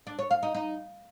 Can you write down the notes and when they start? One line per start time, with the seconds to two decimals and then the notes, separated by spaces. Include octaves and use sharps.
0.07 D4
0.19 C#5
0.31 F5
0.43 D#4
0.55 D#4